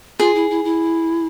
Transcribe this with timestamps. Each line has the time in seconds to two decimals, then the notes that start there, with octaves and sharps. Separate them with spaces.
0.19 F4 G#4
0.35 E4
0.50 E4
0.64 E4